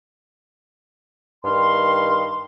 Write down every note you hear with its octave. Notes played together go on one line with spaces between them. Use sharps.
G2 D#3 F5 C6